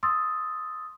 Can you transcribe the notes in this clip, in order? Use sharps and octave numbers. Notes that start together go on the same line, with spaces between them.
C6 D#6 E6 A6